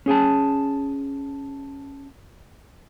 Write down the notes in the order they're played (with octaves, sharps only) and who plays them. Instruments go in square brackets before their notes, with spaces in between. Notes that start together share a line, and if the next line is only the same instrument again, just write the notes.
[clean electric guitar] C#4 G#4 G#5 A5